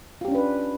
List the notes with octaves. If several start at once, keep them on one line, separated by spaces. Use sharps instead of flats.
C#4 D4 F4 G4 B4